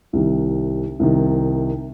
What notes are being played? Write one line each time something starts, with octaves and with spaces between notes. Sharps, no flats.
C2 C3 D#3
C2 C3 D#3